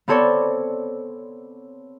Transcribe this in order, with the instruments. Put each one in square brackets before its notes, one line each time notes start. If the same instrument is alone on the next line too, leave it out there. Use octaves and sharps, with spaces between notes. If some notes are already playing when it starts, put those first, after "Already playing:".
[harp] B3 C4 A4 C#5 D5